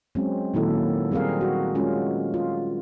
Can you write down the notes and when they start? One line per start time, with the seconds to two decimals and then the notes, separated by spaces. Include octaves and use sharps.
0.15 F#3 G#3 C4 C#4
0.54 A#2 D#3 F#3 A#3 E4 A4
1.11 G3 C4 G#4 A#4 F5
1.41 F#4
1.75 G#3 C#4 F4
2.34 F4